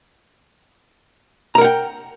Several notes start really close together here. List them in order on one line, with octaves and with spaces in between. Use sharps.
A#5 A#4 F#5 G5